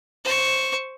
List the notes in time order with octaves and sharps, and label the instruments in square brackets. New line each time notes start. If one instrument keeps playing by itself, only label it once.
[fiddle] C5 C#6